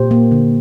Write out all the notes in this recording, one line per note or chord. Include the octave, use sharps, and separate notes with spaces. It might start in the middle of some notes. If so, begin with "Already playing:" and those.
Already playing: A#2 G4 C5
A#3
D3